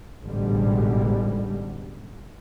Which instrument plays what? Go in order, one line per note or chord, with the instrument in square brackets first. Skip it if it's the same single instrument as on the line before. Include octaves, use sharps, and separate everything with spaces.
[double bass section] A1 G#2 B2 D3 G3 G#3